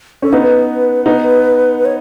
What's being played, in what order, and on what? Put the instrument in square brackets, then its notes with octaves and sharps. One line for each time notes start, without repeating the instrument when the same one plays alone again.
[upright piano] C#4 [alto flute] A4
[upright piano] B3 D#4 [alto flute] B4
[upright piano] B3 D#4 [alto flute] B4
[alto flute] B4
C#5